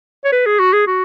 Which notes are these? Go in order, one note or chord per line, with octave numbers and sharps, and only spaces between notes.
C#5
B4
G#4
F#4
G#4
F#4